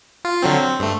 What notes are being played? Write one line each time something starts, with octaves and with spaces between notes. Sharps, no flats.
F4
D3 F#3 C4
C4
G2 A3